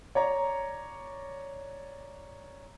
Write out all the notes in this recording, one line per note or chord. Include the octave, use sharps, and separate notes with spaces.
C#5 D5 A#5